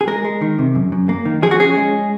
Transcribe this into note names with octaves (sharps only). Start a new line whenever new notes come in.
G#4
G#3 A#4
G#3
D#3
C3
F#2
F#2
A#3
D#3
F3 G#4
F#4
C#4 G#4
G#3